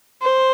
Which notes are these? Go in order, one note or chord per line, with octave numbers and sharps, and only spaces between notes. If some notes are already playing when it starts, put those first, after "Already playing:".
C5